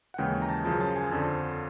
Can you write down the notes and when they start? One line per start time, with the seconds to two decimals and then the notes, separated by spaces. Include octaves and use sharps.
0.14 F#5
0.18 D#2 C#3 E3 G#3 G5
0.42 A#5
0.49 A5
0.65 F#2 C#3 F3 A5
0.81 A5
0.96 G#5
1.11 F2 D3 F3 A5